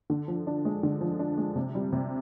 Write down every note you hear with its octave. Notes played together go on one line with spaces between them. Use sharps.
D3
F3
D4
G#3
D3
F3
D4
G#3
C3
G3
C3